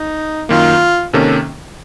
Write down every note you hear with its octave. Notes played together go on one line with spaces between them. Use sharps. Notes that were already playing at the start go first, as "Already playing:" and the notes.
Already playing: D#4
F#2 D#3 A#3 F4
C3 D#3 A#3 C#4 A4